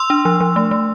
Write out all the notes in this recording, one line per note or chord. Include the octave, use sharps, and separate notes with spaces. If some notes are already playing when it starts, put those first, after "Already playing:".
Already playing: C6 E6
D4
F3
F3
A3
A3